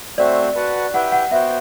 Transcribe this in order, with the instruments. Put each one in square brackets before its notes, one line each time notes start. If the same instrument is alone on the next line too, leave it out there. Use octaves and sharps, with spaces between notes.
[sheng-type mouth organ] A3 C4 F#4 C5 E5 [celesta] D5
[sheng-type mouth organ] F#4 B4 F#5 A5
[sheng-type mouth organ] E4 G4 B4 E5 G5 [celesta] F#5
[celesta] F#5
[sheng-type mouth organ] B3 F#4 C5 G5 [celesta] E5